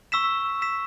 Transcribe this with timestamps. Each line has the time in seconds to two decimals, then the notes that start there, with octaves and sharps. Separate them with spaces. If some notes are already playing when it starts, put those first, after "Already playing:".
0.12 C#6 E6 B6 E7
0.62 E6 B6 E7